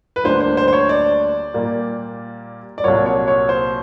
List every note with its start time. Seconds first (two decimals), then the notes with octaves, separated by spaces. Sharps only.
0.16 B4
0.24 D2 D3 G3 A#3 C5
0.41 C5
0.57 C5
0.68 C5
0.73 C#5
0.89 D5
1.54 A#2 G3 A#3
2.78 D5
2.84 C2 A#2 F#3 A#3 C#5
3.06 C#5
3.28 C#5
3.49 C5